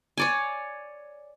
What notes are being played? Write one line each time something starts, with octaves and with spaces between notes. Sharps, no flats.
C#5 D5 G#5